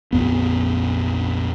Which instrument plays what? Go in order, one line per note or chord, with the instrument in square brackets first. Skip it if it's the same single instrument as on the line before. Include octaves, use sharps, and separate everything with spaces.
[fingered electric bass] A#1 F2 B3